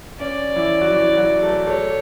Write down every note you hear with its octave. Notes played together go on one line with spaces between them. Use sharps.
C#4 D5
E3 E4
F#4
E3 E4
F#3 F#4
A3 A4
A3 A4 C#5